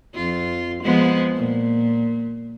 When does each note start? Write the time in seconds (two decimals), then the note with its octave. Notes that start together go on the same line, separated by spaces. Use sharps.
0.14 F2 F4
0.83 F3 G#3 B3
1.35 A#2